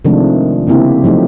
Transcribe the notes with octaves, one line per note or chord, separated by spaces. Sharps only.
C3 D#3 F3 G#3 A3 D4
C#3 A#3 C4 E4 G4
F3 F#3 A3 D#4 G4